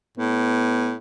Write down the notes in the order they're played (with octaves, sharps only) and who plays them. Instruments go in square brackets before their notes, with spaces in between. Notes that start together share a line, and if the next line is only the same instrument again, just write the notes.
[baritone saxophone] A2 [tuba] B3